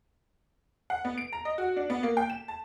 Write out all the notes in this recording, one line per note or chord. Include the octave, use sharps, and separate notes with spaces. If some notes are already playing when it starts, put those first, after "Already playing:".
F#5
B3
D7
A#5
D#5
F#4
D4
B3
A#3
G5
E7
A5